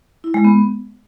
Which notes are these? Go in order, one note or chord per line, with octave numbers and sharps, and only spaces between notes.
E4
G#3
B3